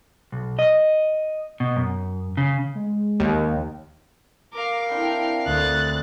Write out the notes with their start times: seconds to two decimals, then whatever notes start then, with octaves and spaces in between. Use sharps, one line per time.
0.32 B1
0.59 D#5
1.60 B2
1.76 F#2
2.37 C#3
2.75 G#3
3.20 D#2
4.53 A#4 F5 D6
4.90 C4 D4 E4 G5
5.46 D2 F#6 A6